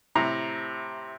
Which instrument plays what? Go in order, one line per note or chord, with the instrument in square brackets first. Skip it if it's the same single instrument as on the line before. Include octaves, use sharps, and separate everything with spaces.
[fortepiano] A2 C3 A#5